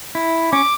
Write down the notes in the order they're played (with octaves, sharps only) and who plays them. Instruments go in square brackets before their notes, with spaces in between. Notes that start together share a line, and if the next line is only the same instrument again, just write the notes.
[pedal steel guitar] E4
[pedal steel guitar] C#4 [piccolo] D6